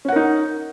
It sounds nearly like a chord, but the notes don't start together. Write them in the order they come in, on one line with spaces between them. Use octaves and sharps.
C#4 F#5 A#4 D#4